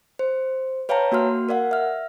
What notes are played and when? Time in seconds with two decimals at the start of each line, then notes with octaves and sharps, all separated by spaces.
0.19 C5
0.89 B4 C#5 F5 G5 A5 A#5
1.12 A#3 F#4 C6 F6
1.49 A#4 D5 F5 F#5
1.71 E5 F6